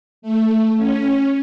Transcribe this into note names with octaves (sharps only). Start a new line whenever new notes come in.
A3
C#4